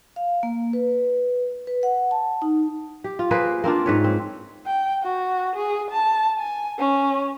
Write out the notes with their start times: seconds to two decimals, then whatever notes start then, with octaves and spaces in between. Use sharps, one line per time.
0.16 F5
0.43 A#3
0.73 B4
1.67 B4
1.83 F#5
2.11 A5
2.42 D#4
3.04 G4
3.19 F4
3.31 A#3 G#4 B4 C5
3.64 A#3 C4 D4 F4
3.86 G#2 B4 C#5
4.04 C4
4.66 G5
5.03 F#4
5.56 G#4
5.90 A5
6.38 G#5
6.79 C#4